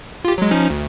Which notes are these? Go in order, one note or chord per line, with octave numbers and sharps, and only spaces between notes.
F4 G4
F#3 G#3
F3 C#4 D#4
D2